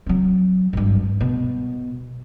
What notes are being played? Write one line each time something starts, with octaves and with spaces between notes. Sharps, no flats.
F#3 C4
G#1 G2
B2